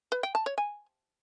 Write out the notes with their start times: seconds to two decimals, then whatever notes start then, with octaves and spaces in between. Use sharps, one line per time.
0.12 B4
0.23 G5
0.35 A5
0.46 C#5
0.58 G#5